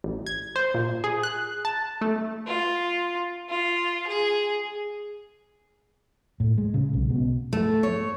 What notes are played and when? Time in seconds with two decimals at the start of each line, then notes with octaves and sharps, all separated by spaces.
0.04 A1
0.26 G#6
0.56 C5
0.74 A#2
1.04 G#4
1.23 F#6
1.65 A5
2.01 A3
2.47 F4
3.50 F4
4.07 G#4
6.40 A2
6.58 G#3
6.74 C#3
6.93 B1
7.10 B2
7.53 A3
7.83 C#5